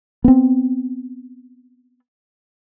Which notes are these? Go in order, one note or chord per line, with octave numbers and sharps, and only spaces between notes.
B3 C4